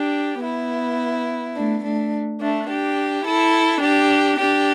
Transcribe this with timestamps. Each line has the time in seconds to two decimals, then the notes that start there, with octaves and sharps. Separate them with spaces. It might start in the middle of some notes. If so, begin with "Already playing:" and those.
Already playing: D4 G4
0.43 B3 E4
1.56 A3 D4
1.84 A3 D4
2.41 A3 D4
2.69 D4 G4
3.26 E4 A4
3.83 D4 G4
4.39 D4 G4